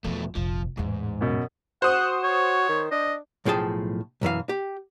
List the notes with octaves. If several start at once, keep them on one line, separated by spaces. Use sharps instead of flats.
E2 B2 F3 A3
F1 A#1 F3
A1 E2 G#2
F#2 B2
F#4 C5 F#5 D#6
C#5
D#3
D4 D#5
B1 A2 F3 G#4 G5 A5
B1 F#2 E3 F5
G4